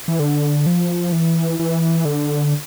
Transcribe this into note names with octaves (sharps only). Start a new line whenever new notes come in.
E3
D3
F3
E3
E3
D3